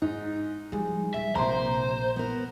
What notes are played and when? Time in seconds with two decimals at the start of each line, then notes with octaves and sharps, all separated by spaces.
0.02 G#2 D#4
0.72 F3 G3 G#3
1.14 D#1 E5
1.35 A#1 C3 A#3 C5 A#5 C6
2.16 B3 A#4